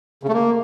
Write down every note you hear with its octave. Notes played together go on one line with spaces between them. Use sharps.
C#3
A3
A#3